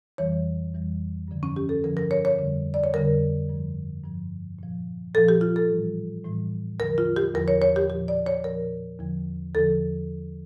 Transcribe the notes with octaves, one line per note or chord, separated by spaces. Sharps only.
F2 E3 G3 C#5
F2 E3 G3
G2 D3 F3
C#4
G4
A4
G2 D3 F3 A#4
A#4
C#5
C#5
F2 D3 G3
D5
C#5
F2 D3 G3 A#4
G2 F3
G2 F3
A#2 F3
A#2 F3 A4
G4
F4
A4
A2 E3 G3
A2 E3 G3
E2 D3 F3 A#4
F4
G4
E2 D3 F3 A#4
C#5
C#5
G4
A#2 F3 G4
D5
C#5
A#2 F3 A#4
E2 D3 F3
E2 D3 F3 A4